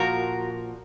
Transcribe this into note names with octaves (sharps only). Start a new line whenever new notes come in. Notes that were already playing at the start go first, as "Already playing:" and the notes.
Already playing: A#2 F3 F#4 A#4